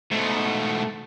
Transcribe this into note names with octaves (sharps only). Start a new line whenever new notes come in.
G#2 B2 A3